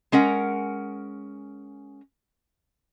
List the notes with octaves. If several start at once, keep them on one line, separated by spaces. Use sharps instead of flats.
G#3 C#4 A#4 F#5